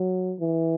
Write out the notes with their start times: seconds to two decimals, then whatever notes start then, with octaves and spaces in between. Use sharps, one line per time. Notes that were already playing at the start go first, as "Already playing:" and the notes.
Already playing: F#3
0.40 E3